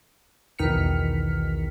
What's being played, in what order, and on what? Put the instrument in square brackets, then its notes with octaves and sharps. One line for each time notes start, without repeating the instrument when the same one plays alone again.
[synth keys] B1 E2 D#3 F6 B6 C#7